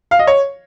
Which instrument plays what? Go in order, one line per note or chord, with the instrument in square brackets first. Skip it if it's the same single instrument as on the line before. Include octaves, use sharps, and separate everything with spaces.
[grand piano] F5
D#5
C#5